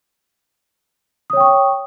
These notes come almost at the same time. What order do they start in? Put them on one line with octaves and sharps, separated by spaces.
D#6 C#5 G5 C#6